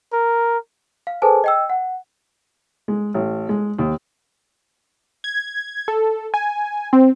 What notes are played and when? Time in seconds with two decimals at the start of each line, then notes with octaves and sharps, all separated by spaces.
0.13 A#4
1.07 F5
1.22 G#4 A4 B4 C5 G#5 A5
1.44 D#5 G5 E6
1.70 F#5
2.88 G#3
3.14 A1
3.49 G#3
3.79 D#2
5.24 G#6
5.88 A4
6.34 G#5
6.93 C4